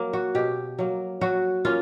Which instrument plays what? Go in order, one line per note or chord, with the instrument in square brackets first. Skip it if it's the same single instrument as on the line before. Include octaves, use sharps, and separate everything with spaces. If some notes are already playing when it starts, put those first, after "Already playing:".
Already playing: [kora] F#3 A#3
F#4
B2 G4
F#3 A#3
F#3 F#4
A#3 C#4 F4